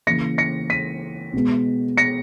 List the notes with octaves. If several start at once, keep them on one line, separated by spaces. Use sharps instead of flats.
C#3 E3 A#3 A#6 C#7
A#6 C#7
B6 D#7
B2 G#3 B3
A#6 C#7